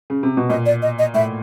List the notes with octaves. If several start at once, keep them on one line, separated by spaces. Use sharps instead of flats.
C#3
C3
B2
A#2 D#5
D5
D#5
D#5
A2 E5